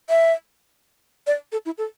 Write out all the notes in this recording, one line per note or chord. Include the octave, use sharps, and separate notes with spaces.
E5
D5
A4
E4
A4